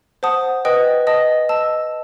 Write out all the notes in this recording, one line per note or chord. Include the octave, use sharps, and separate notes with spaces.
C5 F#5 A5 D#6
B4 D#5 G5 D#6
D#5 A5 D#6
D#5 A5 E6